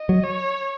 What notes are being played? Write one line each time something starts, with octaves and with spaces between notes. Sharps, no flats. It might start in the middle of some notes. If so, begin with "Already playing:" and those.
Already playing: D#5
F#3
C#5